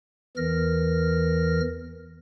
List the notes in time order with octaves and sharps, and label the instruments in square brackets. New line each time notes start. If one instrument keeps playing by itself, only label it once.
[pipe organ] E2 E3 A#4 F6 A#6